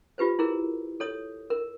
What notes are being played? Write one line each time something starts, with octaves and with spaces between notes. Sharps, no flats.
F4 G4 B4 C5
E4 G#4 A#4
A4 C#5 D#6
A#4